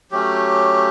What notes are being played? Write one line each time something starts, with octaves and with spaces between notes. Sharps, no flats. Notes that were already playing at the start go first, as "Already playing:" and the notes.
F#3 A3 C#4 G4